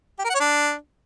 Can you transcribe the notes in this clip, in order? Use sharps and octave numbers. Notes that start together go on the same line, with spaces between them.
G4
A#4
F#5
C#5
D4